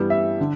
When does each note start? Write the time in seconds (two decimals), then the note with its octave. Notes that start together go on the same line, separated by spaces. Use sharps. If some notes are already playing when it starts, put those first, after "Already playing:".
Already playing: G2 E3 G3 B3
0.10 E5
0.40 D3